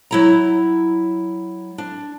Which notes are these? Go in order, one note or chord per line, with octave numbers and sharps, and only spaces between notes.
F#3 E4 A#5
D4